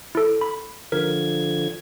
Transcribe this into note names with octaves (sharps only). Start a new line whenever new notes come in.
E4 A4
B5
D3 F3 A#4 G#6